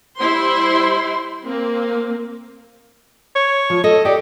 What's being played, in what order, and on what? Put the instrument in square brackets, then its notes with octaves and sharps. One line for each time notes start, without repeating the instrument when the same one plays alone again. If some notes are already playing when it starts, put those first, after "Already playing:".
[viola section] G3 E4 C5 C6
A#3 C4
[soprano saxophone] C#5
[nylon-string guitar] F3
[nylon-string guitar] A4 [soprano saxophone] D#5
[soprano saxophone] G4 [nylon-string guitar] D5 D#5